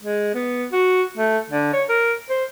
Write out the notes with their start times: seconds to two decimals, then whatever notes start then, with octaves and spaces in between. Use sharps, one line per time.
0.02 G#3
0.35 B3
0.72 F#4
1.17 A3
1.50 D3
1.73 C#5
1.89 A#4
2.30 C5